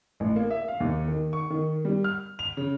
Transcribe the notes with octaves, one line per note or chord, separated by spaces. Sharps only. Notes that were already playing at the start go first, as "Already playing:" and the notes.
A1
A#3
E5
F5
D#2
D#3
C#6
D#3
G3
F6
F7
C#3